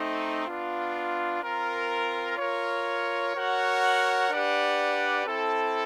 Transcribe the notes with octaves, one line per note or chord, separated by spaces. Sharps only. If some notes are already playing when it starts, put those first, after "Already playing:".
Already playing: A3 C4 D#4
B3 D4 F4
C4 F4 A#4
F4 A#4 C#5
F#4 A#4 C#5 F#5
D4 G4 B4 D5 F#5
C4 E4 A4